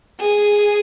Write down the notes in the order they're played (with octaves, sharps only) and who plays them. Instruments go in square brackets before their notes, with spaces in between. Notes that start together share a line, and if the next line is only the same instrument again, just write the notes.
[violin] G#4